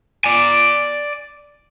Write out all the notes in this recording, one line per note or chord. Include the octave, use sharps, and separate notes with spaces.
D5 G#5